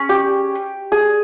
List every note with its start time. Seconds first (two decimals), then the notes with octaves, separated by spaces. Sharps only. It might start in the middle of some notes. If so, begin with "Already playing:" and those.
Already playing: C#4 G#4
0.09 G4
0.92 G#4